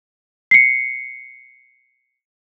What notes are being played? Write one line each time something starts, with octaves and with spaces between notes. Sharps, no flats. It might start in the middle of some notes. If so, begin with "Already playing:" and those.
C7 C#7